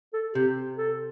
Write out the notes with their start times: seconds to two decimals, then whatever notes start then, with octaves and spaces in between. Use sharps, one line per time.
0.13 A4
0.34 C3 G4
0.78 A4